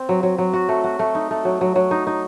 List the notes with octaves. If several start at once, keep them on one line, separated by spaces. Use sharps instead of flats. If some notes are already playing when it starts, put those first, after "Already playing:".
Already playing: C4
F#3
F#3
F#3
F#4
A3
F#4
A3
D#4
A3
F#3
F#3
F#3
D#4
D#4